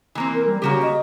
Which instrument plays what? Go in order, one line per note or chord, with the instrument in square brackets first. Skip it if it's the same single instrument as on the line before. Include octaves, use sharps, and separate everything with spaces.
[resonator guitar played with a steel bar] E3 A#3 C4
[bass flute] A#4
G3
[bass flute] C#3 [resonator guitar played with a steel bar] A#3 F#4 G4
[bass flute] D#5